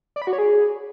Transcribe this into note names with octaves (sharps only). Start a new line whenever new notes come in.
D5
B5
F#4
C#5
G#4